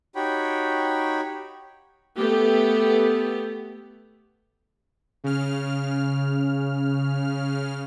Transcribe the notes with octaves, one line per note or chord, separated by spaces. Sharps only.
D#4 F#4 G4 C#5 G5 B5
A3 B3 G4
C#3 F6